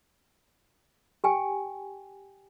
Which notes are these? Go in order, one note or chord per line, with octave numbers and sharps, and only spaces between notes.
G4 G5 G#5